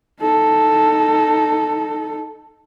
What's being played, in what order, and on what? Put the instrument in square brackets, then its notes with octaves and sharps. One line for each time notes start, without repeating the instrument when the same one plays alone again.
[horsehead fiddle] D#4 A4